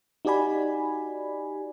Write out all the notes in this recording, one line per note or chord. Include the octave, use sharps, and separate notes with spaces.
D#4 F#4 G4 D5 G#5 B5